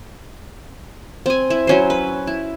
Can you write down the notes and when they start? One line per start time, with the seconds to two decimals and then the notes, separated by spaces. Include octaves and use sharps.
1.26 C4 G#5
1.50 E4
1.67 F#3 C#4 C5
1.90 B4
2.27 E4